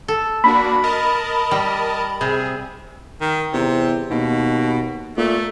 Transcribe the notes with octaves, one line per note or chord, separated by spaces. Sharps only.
A4
A#3 D4 F#4 B5
A#4 D#5 A5
G3
C3 G#4
D#3
E2 C3
D#2 B2
A#2 A3